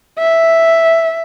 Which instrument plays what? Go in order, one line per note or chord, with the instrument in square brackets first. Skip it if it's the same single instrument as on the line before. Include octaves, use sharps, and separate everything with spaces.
[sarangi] E5